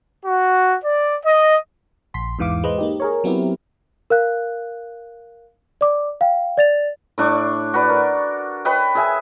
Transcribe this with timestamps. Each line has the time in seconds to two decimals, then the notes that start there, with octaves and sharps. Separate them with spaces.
0.25 F#4
0.83 D5
1.24 D#5
2.14 A#1 C6 B6
2.39 E2 G#2 E3 F5 D6
2.64 G#3 B4 C5 D#5
2.78 A#3 D#4 G4
3.00 G#4 A#4 C#5
3.24 F#3 B3 C4 E4 G4 A#4
4.10 A#4 F5 F#6
5.81 D5 D6
6.21 F5 G5
6.57 D5 A6 F7
7.18 A2 D4 C#6 D6
7.74 F#4 B4 D5
7.89 A#4
8.65 B4 C#5 D#5 G5
8.95 G#4 E5 G#5